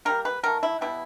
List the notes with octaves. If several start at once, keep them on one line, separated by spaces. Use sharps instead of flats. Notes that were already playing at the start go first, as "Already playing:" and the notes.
D3 G3 A#3 A#4
B4
D#3 F#3 A3 A#4
E4
B2 G3 B3 E4